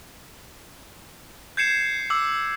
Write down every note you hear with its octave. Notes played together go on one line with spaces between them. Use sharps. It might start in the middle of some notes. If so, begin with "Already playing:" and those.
G6 G#6 C7 C#7 E7
D6 E6